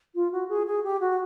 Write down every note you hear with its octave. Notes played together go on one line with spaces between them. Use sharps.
F4
F#4
G#4
G#4
G4
F#4